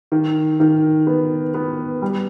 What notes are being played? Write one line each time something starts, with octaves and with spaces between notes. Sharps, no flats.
D#3
D#3
B3
B3
G3